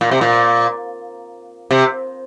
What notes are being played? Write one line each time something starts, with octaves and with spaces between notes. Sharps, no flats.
A#2
C3
A#2
C3